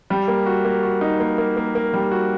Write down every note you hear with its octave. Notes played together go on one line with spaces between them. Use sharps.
G3
A#3
F#4
A#3
F#4
D#4
A#3
A#3
A#3
A#3
G3
F#4